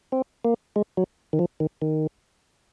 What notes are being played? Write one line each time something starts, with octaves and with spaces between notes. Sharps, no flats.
C4
A#3
G#3
F#3
D#3
F3
D#3
D#3